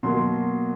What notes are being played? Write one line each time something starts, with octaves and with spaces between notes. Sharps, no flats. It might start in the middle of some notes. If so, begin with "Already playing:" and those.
B2 F#3 A#3 C6